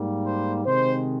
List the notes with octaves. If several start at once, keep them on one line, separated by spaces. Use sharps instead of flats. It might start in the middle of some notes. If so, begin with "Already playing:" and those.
Already playing: G#2 G3 A#3
C5
C3 D#3 G#3 C5